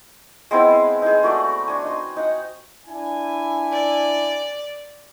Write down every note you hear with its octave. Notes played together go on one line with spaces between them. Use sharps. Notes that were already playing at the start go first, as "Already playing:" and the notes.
G#3 B3 C4 E4
D#4 G#4
A3 F#4 D5
D4 G#5
D#4 C6
D#4 F#5
D4 E4 G#5
D5